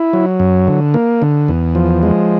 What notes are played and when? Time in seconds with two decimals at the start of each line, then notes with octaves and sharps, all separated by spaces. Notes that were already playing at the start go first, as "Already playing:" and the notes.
Already playing: E4
0.13 F#3
0.40 F#2
0.67 D3
0.94 A#3
1.22 D3
1.48 E2
1.75 F3
2.03 G#3